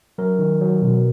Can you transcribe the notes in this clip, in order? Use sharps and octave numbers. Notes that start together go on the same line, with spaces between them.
F#3 A#4
D#3
F#3
B2